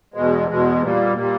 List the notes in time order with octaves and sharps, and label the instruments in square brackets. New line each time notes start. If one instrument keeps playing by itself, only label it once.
[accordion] E2 B2 G#3
E2 B2 G#3
A#2 G3 A#3
A#2 G3 A#3